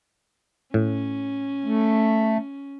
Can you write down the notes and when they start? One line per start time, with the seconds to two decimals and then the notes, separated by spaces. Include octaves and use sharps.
0.74 A2 C#4
1.65 A3